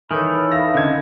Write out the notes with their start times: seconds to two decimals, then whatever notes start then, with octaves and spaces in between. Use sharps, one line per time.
0.11 D#3 E3 A4 B4 C#5 B5
0.52 E5 F5 A#6
0.74 D3 C4 C#4 D#4 G#6